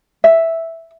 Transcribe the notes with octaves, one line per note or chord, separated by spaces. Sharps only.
E5